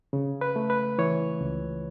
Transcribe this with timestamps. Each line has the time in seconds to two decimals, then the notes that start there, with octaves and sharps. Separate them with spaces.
0.13 C#3
0.41 B4
0.56 A3
0.70 B4
0.98 E3 C#5
1.41 C#2